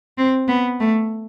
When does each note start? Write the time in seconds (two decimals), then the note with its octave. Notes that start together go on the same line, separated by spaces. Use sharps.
0.18 C4
0.48 B3
0.80 A3